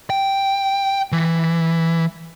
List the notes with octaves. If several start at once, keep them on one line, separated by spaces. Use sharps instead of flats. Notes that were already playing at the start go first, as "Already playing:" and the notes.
G5
E3